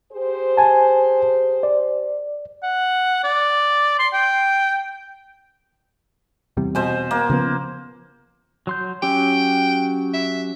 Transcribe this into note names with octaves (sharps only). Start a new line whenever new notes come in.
G4 G#4 C5
G#5 A5
D5
F#5
D5
C6
G5
E2 C3 G3
B2 C5 G#5
A#3
C#3 F3 B3
F#3 C6 G6
F#3 C#4 G4 G5
E5